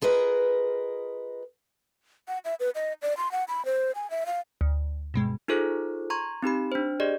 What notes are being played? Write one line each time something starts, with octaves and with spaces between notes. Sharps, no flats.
F4 G#4 A#4 B4 D#5
F#5
E5
B4
D#5
D5
C6
F#5
B5
C5
G#5
E5
F5
D2
G2 B2 G#3
D#4 F4 G#4 A4 C5 F#6
A#5 C6 C#6 G#6
C4 D#4 G4 B5
D4 C5
G4 G#4 D5 D#5